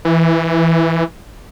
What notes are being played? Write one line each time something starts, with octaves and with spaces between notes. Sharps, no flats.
E3